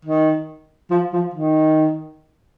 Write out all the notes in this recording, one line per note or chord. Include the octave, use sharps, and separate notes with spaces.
D#3
F3
F3
D#3